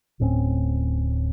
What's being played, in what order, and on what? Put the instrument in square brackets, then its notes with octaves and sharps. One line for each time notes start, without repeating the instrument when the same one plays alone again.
[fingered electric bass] D1 A2 C4 C#4